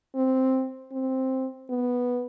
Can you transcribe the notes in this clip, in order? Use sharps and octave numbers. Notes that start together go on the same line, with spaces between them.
C4
C4
B3